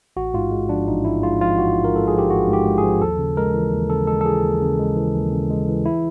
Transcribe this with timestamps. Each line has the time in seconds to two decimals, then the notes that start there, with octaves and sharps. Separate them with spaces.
0.16 A1 F#4
0.34 G#2 F4
0.51 G#3
0.69 F3 D4
0.88 A1 D#4
1.05 G#2 E4
1.23 G#3 F4
1.41 F3 F4
1.58 A1 F#4
1.77 G#2
1.84 A#4
1.94 G#3 A4
2.08 F3 G#4
2.18 G4
2.29 A1 F#4
2.47 G#2
2.53 G4
2.65 G#3
2.78 G#4
2.84 F3
3.01 D#2 A4
3.18 C#3
3.37 G#3 A#4
3.54 E3
3.72 D#2
3.89 C#3 A4
4.07 G#3 A4
4.21 A4
4.25 E3 G#4
4.43 D#2
4.62 C#3
4.79 G#3
4.97 E3
5.15 D#2
5.32 C#3
5.50 G#3
5.69 E3
5.86 E4